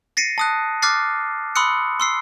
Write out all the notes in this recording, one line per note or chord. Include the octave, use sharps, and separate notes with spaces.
A6 A#6 C7 C#7 D#7
A5 D#6 F#6
D6 F6 F#6 A6 C7
B5 C6 D#6 E6 F#6 C#7
C6 E6 C7